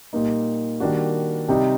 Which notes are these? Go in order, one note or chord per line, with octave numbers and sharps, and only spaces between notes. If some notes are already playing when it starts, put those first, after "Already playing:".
A#2 G3 A#3 D#4
D#3 G3 A#3 D4 F#4
C3 G3 C4 D#4